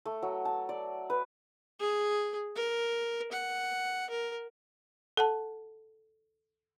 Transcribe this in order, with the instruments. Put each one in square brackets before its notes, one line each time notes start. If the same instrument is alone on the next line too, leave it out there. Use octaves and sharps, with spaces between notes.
[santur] A3
F#3
A5
D5
B4
[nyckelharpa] G#4
A#4
F#5
A#4
[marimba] A4 F#5 A5